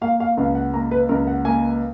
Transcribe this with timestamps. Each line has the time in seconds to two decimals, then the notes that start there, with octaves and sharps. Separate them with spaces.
0.01 A#3 F5
0.20 F5
0.37 C#2 F5
0.55 F#5
0.74 A#3 A#5
0.91 B4
1.09 C#2 A#4
1.27 F#5
1.45 A#3 G#5